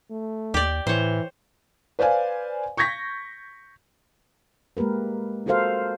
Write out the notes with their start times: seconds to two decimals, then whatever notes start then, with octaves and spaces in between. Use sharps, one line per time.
0.10 A3
0.54 D#2 G4 D5
0.87 A2 E3 C5 C#5
1.99 B4 C5 D5 F5 G#5
2.77 C#6 G6 G#6 A#6 B6
4.77 G#3 A#3 G4 A#4 B4
5.46 F4 F#4 A4 A#4 C5 F5